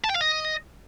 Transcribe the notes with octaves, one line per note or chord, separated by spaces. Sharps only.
A5
G5
F5
D#5